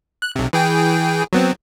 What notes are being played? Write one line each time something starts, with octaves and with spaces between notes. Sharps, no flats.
F#6
B1 C3
E3 G#4 G5
F#3 B3 C4